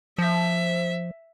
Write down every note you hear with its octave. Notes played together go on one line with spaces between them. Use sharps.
F3 E5